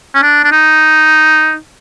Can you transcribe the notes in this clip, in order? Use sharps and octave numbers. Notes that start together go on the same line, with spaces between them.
C#4
D4
D4
D#4